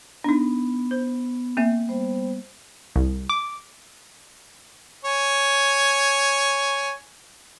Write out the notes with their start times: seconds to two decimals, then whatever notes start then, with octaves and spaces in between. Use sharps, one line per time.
0.24 B3 D4 D#4
0.91 C5
1.57 A#3 C4 E5
1.88 G3 B3 C5
2.96 C2
3.30 D6
5.05 C#5 G#5